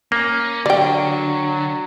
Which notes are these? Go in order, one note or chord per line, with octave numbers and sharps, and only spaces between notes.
A#3 C#4
D3 F#3 D5 G5